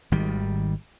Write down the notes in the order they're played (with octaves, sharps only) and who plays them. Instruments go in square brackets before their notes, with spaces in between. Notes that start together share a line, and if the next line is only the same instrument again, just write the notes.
[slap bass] G#1 D#3 G3